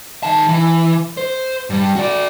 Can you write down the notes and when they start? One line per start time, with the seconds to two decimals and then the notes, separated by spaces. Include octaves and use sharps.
0.23 D#3 A5
0.49 E3
1.17 C5
1.70 G2 G3
1.96 F#4 D5